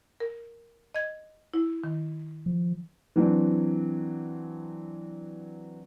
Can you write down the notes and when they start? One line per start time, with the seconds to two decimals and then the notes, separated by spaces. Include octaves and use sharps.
0.20 A#4
0.95 D#5 G#6
1.54 E4
1.84 D#3
2.46 F3
3.16 E3 F#3 C4 D4